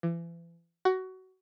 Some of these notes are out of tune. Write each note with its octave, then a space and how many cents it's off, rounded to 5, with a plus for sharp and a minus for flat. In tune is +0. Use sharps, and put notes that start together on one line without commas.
E3 +40
F#4 +20